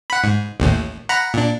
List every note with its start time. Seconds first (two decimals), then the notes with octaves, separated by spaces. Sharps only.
0.10 F#5 B5
0.24 G#2
0.60 A1 D#2 A2
1.09 F#5 A#5 B5
1.34 A#2 D4